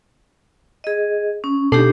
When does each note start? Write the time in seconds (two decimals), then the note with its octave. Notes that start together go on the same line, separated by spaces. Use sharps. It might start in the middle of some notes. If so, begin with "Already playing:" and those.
0.84 G#4 D#5
1.44 C#4
1.72 B2 D4 D#4 G4 A4 C7